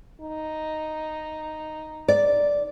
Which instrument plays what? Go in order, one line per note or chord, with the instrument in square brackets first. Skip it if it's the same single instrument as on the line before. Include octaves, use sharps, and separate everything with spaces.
[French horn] D#4
[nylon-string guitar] D5